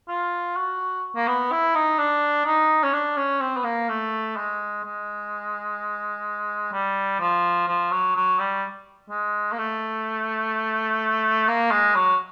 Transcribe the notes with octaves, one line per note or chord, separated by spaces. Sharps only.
F4
F#4
A#3
B3
E4
D#4
D4
D#4
C#4
D4
C#4
C4
B3
A#3
A3
G#3
G#3
G3
F3
F3
F#3
F#3
G3
G#3
A#3
A3
A#3
G#3
F#3